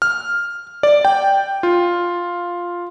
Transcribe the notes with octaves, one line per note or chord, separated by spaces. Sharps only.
F6
D5
G5
F4